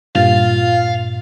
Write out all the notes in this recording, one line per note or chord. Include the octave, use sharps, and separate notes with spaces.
G2 A#2 F4 F5 A6